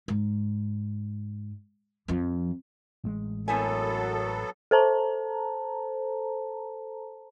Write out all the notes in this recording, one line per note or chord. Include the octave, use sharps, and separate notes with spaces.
G#2
F2 F3
A1 G#3
F#2 F#3 B3 C4 E4 A4 G#5
A4 C5 A5 A#5